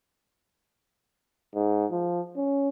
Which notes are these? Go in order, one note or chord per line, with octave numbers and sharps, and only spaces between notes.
G#2
F3
C#4